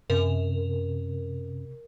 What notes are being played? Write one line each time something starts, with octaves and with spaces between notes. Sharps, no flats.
F#2 C3 A#4